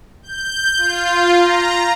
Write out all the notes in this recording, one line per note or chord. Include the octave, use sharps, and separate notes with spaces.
G6
F4
A#5